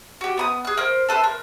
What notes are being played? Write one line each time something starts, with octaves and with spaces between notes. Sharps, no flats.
F#4 G4
B3 B5 D#6
G#4 F#6
A#4 C5
A4 B4 C5 E5
A#4